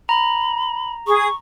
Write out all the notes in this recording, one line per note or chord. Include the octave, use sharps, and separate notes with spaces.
A#5 B5
G#4 C#6 D#6